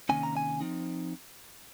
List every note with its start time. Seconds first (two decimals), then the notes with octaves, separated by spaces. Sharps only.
0.09 C3 D#3 A#3 C#4 G#5
0.23 A#5
0.37 G#5
0.61 F3 C4 D#4